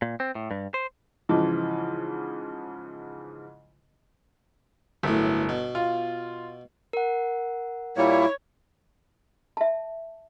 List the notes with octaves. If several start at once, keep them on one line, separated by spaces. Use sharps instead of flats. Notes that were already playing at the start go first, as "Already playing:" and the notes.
A#2
C4
A2
G2
C5
G#2 C#3 E3 F3
G1 F#2 A2
B2
F4
A#4 F#5
A#2 G3 A#3 E4 C#5
E5 A5